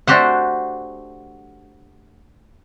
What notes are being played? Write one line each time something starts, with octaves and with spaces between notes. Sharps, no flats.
A3 D4 F#4 G4 C5 F#5